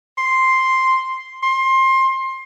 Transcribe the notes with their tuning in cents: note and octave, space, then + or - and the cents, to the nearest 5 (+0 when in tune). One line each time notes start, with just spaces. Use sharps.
C6 +0
C6 +25